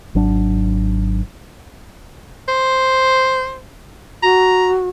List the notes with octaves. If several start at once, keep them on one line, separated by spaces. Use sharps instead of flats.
G#1 F#3 D4
C5
F#4 A#5